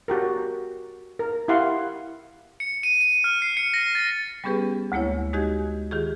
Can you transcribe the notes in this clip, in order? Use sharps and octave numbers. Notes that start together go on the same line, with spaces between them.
F#4 G4 A#4
A#4
E4 G4 F5 F#5 C6
C#7
D#7
D#7
F6
C7
C#7
A#6
A6
G3 B3 C#4 G4 G#4 B4
D2 G#3 A#3 E4 C#5
G#3 D#4 F#4 G4 D#5 G#6
D#3 F4 G4 G#4